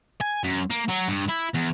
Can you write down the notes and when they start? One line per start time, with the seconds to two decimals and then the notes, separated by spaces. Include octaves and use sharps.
0.21 G#5
0.44 F#2
0.71 A#3
0.89 F#3
1.08 G2
1.29 E4
1.54 E2